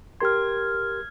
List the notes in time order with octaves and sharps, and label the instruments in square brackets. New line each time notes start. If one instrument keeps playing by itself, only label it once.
[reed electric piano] G4 A#4 C6 [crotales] F6 G#6